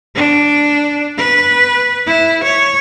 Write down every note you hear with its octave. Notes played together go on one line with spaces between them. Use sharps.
D4
B4
E4
C#5